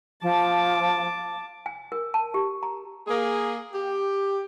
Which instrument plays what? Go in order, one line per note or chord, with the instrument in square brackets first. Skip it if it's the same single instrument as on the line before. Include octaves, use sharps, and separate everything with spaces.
[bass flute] F3 [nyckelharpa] A5 D6
[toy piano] G#5
A#4
A5
G4
A#5
[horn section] A#3 G#4
G4